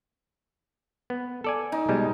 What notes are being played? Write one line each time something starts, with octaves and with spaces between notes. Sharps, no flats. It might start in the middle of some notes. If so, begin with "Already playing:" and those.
B3
A4 D5 G#5
D#4
B2 G3 G#3